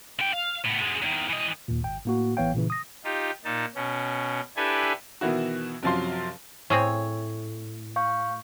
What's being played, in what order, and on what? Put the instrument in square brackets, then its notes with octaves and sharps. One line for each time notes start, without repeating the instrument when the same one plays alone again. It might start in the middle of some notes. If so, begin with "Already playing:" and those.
[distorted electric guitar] D3 G5
F5
A2 B3
F#2 G#3
E2 D#3
E3 D#5
[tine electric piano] D#2 A#2
G#1 G5
A2 A#3 F#4
A1 E3 B3 C#5 F5 G5
A#2 C#3 E3
D#6 A#6
[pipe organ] D#4 F4 G4
A#2 D#4 A5
B2 C#4
D4 E4 G4 A4 B4 G#5
[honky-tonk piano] B2 D#3 E3 E4 F#4
F#2 C3 F3 F#3 F5 C6
[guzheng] A2 [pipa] C4 G#4 C#5
[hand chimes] F5 C#6 G6